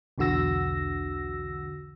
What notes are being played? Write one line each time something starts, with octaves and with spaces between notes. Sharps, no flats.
B1 E2 D3 F#4 E6 A#6